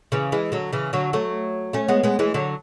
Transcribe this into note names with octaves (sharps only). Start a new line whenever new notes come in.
C#3 E3
E3 G#3
D3 F#3
C#3 E3
D3 F#3
F#3 A3
A3 C#4
G#3 B3
G#3 B3
E3 G#3
D3 F#3